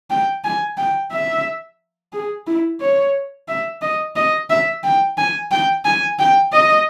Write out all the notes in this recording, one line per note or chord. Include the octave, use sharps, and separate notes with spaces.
G5
G#5
G5
E5
G#4
E4
C#5
E5
D#5
D#5
E5
G5
G#5
G5
G#5
G5
D#5